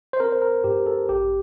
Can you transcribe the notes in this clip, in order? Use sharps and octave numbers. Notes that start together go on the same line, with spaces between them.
C5
C4 A#4
C5
A#4
G2 G4
A4
A1 G4